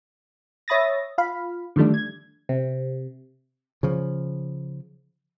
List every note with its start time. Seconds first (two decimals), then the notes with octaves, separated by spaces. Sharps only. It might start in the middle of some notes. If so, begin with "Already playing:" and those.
0.68 C#5 E5 B5 D#6 A6 A#6
1.18 F4 F5 B5
1.76 D3 D#3 F3 G3 A3 D4
1.94 G#6
2.49 C3
3.83 C#3 F3